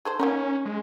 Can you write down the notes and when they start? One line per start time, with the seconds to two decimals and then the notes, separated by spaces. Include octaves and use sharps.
0.05 G#4 A4 C5
0.19 A#3 C#4 D#4 A#4
0.65 G#3